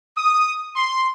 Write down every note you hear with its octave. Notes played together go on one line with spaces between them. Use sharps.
D#6
C6